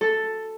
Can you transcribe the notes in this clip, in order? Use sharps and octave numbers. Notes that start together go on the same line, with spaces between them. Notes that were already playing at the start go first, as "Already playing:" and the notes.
A4